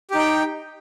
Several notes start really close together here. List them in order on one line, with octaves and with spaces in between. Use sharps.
G4 D#4 G5